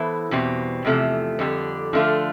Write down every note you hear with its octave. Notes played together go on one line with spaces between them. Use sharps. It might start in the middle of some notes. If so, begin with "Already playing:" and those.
Already playing: E3 B3 E4 A4 C5
E2 B2 G3 C4
E2 C3 F3 A3
F2 D3 G3 D4
D3 F3 A3 D4 F4